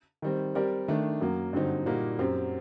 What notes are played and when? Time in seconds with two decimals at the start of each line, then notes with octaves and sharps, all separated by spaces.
0.22 D#3 G3 C4
0.55 G3 C4 G4 A#4 D5
0.88 D#3 A3 D4
1.21 F#2 F#3 A#3
1.53 G2 D3 F#3 C4 D#4
1.86 A#2 G3 A#3 D#4 F#4
2.19 F#2 F#3 C4 G4